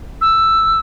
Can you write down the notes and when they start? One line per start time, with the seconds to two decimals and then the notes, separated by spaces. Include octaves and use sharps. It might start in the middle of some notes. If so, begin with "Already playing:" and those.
0.21 E6